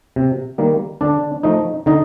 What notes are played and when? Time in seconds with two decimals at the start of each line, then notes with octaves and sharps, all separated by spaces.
0.16 C3
0.58 D#3 G3 A#3
1.01 D3 D4 D5
1.43 F3 A3 D#4 D#5
1.86 D3 D#4 D#5